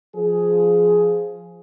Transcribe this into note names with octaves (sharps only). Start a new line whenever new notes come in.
F3 G#4